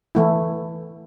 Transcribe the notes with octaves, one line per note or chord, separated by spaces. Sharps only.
E3 A3 E4